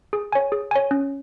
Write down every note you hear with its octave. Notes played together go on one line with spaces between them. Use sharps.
G#4
C#5 G#5
G#4
C#5 G#5
C#4